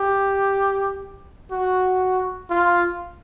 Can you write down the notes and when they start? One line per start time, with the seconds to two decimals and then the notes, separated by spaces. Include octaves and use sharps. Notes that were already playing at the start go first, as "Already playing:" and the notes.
Already playing: G4
1.52 F#4
2.50 F4